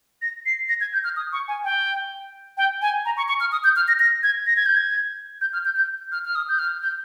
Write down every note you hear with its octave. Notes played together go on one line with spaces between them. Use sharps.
A#6
C7
A#6
G#6
G6
F6
D#6
C#6
G#5
G5
G5
G#5
A#5
C#6
C#6
F6
D#6
G6
F6
A#6
A#6
G#6
A#6
G#6
G6
G#6
G6
F6
G6
G6
F6
F6
D#6
G6
F6
G6